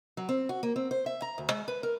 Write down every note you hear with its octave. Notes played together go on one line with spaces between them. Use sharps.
F#3
C4
F#4
A#3
C4
C5
E5
A#5
D2
G#3
B4
A#4